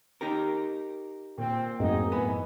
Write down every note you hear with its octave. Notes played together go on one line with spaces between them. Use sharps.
D#4 G4 A#4
A#2 C4
F#2 A2 A#3 C4 D#4 F#4 G#4 D#5
E3 B3 G#5 B5